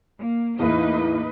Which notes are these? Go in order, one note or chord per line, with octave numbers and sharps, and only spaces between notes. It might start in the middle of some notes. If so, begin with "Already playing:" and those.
A#3
E2 A2 A#3 D#4 B4 D#5